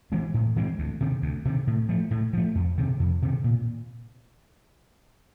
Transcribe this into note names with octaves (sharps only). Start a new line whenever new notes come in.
E3 G#3 C4
A2
E3 G#3 C4
D2
C3 D#3
D2
C3 D#3
A2
F3 A3
A2
F3 A3
F2
C3 D#3
F2
C3 D#3
A#2